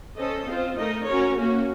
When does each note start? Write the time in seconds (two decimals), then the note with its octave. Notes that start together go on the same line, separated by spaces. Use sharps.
0.18 C#4 A4 C5 D#5
0.48 C4 F4 C5
0.77 A3 D#4 A#4 D#5
1.06 C#4 F#4 A#4 C#5
1.37 A#3 C#4 F#4